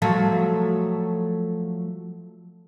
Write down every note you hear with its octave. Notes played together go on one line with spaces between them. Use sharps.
F3 F#3 A3